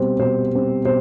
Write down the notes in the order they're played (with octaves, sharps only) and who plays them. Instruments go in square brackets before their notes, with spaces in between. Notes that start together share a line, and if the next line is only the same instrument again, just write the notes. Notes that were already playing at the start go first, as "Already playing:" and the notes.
Already playing: [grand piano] B2 G3 C4 C5
B2 C5
G3 C4
B2 C5